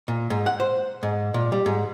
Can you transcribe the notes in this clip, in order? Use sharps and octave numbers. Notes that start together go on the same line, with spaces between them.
A#2
G#2
F#5
C5
G#2
A#2
G3
G#2